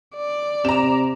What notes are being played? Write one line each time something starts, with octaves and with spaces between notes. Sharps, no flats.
D5
C3 A#5 E7